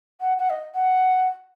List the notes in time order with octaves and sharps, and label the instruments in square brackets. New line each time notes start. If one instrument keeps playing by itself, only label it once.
[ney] F#5
F#5
D#5
F#5